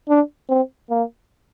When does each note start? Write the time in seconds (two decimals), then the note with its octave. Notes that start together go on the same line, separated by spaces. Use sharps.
0.09 D4
0.49 C4
0.90 A#3